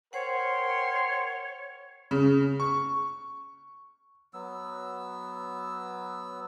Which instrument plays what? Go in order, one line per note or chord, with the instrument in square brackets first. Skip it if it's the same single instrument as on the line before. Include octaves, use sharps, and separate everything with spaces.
[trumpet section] A#4 G5 C6 [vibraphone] C5 F#5 [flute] C#5
[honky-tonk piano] C#3
C#6
[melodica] F#3 B3 E6